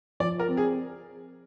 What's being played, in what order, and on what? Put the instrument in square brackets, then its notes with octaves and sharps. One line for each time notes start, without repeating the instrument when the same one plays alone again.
[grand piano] F3 [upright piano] D5
[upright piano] A#4
[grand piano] C4
[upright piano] G#4